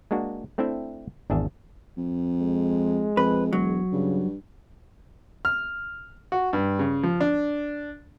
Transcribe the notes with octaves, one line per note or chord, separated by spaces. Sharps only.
G#3 A#3 D4 F#4
A3 C4 D4 E4 E5 G5
G#1 E2 D4 G#4 E5
F2
G#3
F2 B4
E1 F#3
G2 C#3
F6
F#4
G2
C#3
F3
D4